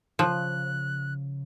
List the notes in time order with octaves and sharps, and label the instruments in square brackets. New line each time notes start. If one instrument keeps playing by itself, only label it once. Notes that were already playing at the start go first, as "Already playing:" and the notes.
[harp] C#3 [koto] F3 [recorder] F#6